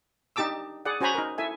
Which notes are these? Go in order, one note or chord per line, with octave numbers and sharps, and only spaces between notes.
D4 D#4 G4 A5 D6 E6
G#4 D5 F#5
C#4 F#4 C5 G#5 A#5 B5
D#4 A#4
E4 A4 E5 G#5